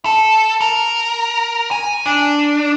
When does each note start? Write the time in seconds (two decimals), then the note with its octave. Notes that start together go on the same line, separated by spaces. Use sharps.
0.05 A4
0.61 A#4
1.71 G#5
2.06 D4